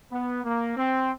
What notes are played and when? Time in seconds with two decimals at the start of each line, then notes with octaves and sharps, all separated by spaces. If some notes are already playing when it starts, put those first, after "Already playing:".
0.10 B3
0.44 A#3
0.76 C4